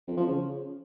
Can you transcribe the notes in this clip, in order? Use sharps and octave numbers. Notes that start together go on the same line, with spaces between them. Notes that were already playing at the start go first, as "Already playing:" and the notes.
F2
F3
C#3